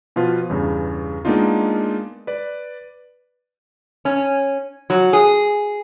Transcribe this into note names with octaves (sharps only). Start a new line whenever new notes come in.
B2 F3 F4 B4
E2 G2 C#3
G#3 A#3 B3 D4 D#4 F4
B4 D5
C#4
F#3
G#4